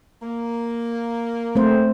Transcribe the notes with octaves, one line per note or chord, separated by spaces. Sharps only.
A#3
A3 C4 C5